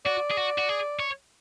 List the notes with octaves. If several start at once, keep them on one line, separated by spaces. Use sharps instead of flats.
F#4 D5
G#4
F#4
F#4
G#4
C#5